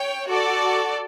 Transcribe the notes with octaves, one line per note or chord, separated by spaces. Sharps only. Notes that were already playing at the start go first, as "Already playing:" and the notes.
Already playing: C#5 G5
F#4 A4 D5